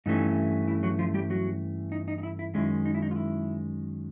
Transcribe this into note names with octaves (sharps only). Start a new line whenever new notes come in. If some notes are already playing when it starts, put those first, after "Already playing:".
G2 E3 A3 C#4 D#4
E4
F#3 F#4
F3 F4
G3 G4
F#3 F#4
D#4
D#4
D#4
E4
E4
F#2 D#3 G#3 C#4 E4
D#4
E4
D#4
F4
E4